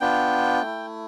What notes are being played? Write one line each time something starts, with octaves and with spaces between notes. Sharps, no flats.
B3 D4 F4 G5
A3 E4